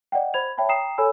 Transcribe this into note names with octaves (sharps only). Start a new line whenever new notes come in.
D5 D#5 F#5 G5
C5 B5 G#6 F7
C#5 E5 G5 A5 B5
G5 A#5 D#6 C7 E7
A4 C#5 G#5 B5 E6